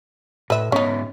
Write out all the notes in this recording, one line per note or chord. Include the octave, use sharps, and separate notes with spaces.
A2 B4 E5
G#2 B3 C#4 D#4 E5